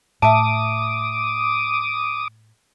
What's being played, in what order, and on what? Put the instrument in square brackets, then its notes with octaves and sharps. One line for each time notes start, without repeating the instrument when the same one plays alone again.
[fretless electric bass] A2 [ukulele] E5 A5 [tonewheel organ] D6 D#6